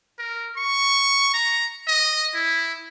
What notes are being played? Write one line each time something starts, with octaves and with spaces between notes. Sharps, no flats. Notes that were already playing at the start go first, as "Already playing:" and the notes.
A#4
C#6
A#5
D#5
E4